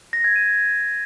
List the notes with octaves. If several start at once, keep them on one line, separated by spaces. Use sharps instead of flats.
A#6
G#6
D#7